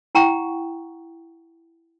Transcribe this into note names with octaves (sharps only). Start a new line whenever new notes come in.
E4 F#5 G5 A#5 C#6